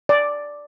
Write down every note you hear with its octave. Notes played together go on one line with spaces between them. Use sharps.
D5